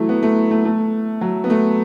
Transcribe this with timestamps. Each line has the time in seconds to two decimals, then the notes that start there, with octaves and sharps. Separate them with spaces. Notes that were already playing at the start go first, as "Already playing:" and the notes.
Already playing: E3 F#3 A3
0.09 B3
0.23 A3
0.51 A3
0.65 A3
1.21 F#3
1.44 B3
1.50 A3